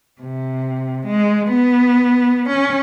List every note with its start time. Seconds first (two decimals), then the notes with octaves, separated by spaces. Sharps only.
0.21 C3
1.06 G#3
1.48 B3
2.49 C#4